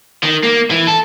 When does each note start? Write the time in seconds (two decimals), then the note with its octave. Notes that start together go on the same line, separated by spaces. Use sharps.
0.23 D#3
0.44 A#3
0.71 E3
0.87 A4